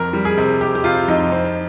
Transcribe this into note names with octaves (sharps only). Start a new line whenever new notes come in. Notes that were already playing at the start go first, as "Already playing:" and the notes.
Already playing: F2 A#4
G3
G#4
C3
C3 G4
G4
C3 F4
F2 D#4
C4